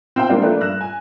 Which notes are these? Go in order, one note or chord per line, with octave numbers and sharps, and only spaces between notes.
C4 F4 G5
G3 G#3 A#3 C4 D4 F4
F3 A3 A#3 D4 B4
G2 F#6 A#6 E7
G#5